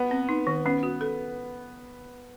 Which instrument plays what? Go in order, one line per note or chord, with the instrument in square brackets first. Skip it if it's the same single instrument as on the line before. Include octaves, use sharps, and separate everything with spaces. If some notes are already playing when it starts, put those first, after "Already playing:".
Already playing: [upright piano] B3
[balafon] C4
D#4
D#3
[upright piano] B3 [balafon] C#4
[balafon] F#4
A4